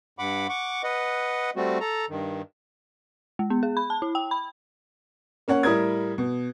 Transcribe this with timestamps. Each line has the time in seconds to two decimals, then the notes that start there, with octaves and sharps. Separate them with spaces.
0.19 G2 F#5 B5 D6
0.49 F#5 C#6 D6
0.84 B4 D#5 F#5
1.56 G3 A3 C4 F#4
1.80 A4 A#5
2.09 G2 D#3
3.39 G#3
3.50 B3
3.63 G#4
3.77 B5
3.90 A5
4.02 E4
4.15 G5
4.31 B5
5.48 A#3 C#4 C#5 F#5
5.63 A2 G3 E4 A#4 D#6 G#6
6.18 B2